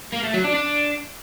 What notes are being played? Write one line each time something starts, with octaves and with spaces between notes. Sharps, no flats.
A#3
A3
F#3
D4
D4